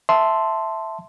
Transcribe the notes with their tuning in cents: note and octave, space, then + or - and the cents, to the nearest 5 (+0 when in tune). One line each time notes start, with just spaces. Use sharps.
E5 +0 A5 +0 C6 +0